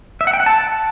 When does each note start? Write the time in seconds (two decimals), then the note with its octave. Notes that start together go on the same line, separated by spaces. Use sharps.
0.21 E5
0.27 F#5
0.33 G5
0.40 F#5
0.46 A5